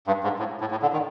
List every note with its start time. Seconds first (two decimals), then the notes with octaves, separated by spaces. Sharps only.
0.07 G2
0.24 G#2
0.39 A2
0.61 A2
0.71 A2
0.82 D3
0.93 D#3